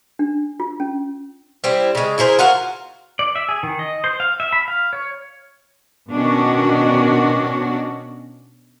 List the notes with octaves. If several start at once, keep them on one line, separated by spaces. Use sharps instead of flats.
D4
F4
C#4
G3 C4 E4
C#3 G#3
E4 G#4 A#4 C5
F4 F#4 A#4 F5
D5
E5
G#4
D#3
D#5
C5
F5
E5
B5
F5
C#5
B2 D#3 C#4 D4 F#4